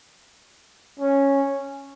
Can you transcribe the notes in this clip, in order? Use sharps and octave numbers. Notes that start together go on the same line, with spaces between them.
C#4